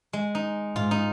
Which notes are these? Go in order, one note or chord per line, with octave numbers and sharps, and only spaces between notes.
G#3
D#4
G#2 F4
D#4